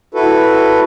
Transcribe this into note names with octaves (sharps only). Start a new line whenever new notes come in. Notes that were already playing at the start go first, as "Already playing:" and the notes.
E4 F#4 A4 B4